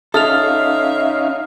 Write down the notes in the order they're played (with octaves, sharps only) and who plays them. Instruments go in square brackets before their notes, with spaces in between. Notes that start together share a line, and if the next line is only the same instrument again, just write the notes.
[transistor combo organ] C#4 D#4 F5 [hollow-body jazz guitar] A4 [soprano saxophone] E5 [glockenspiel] D#6 F6 F7